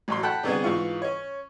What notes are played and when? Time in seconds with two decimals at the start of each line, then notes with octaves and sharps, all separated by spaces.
0.08 A1 F#2 C6
0.23 A4 F#5 G5 A5 B5
0.44 C2 D3 B3 D4 G#4
0.63 G#2 E3 F4 C#6
1.02 C#4 C#5